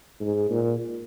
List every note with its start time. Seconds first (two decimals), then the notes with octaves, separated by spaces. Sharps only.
0.20 G#2
0.50 A#2